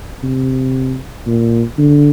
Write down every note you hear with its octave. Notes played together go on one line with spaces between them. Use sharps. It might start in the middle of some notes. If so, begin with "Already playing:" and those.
C3
A#2
D3